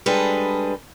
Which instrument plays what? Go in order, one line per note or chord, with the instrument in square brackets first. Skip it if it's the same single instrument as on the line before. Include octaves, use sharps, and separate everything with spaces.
[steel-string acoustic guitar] G3 G#3 D4 G#4 A4 B4